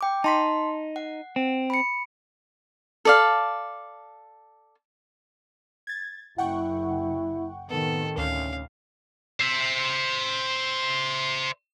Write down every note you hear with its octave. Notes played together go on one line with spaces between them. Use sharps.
G5 D6
D#4 A5 C6 B6
F#5
C4
B5 C#7
A4 D5 F5
G#6 A6
F#1 E4 F#5 G5 C#6
A2 C3 D#3 B3 A4
D2 C#4 F5
C5 E5